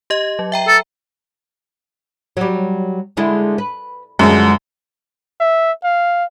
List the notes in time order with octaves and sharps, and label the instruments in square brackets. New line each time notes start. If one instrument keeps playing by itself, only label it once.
[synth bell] G4 D#5
F#3
E5 G5 A#5
[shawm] A4
[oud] F#3 G3
D3 G#3 E4
B4
[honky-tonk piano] F#2 [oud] D3 F3 G#3
[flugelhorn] E5
F5